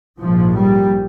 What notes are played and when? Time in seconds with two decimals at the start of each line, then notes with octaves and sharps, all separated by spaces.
0.19 A#1 G#2 F3
0.54 G3